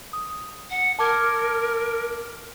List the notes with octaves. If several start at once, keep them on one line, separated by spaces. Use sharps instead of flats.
D#6
F#5
A#4 A5 D6 G#6